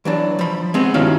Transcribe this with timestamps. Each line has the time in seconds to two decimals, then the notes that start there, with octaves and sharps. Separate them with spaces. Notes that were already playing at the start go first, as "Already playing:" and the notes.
0.05 E3 F#3 D4
0.39 F3 B5
0.74 G#3 B3 C4
0.94 G2 D#3 C#4 E4 F#4 F5